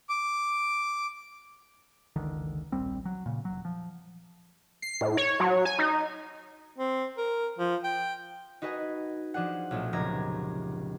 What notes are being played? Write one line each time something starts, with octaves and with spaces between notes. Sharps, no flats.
D6
F#1 C#2 D3 D#3
D1 A#1 G3 C4
F#3
A#2 C#3
F1 F#3
F3
C7
A2
C#5
F#3
G#5
D#4
C4
A#4
F3
G5
D#4 F#4 B4 D#5 G#5
F3 D4 G#4 F#5
B1 A#2 A3
F1 C#2 A#5 G#6